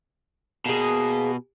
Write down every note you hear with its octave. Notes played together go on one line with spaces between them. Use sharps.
B2 A#3 G#4